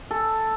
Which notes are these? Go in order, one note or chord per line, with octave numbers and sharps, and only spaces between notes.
A4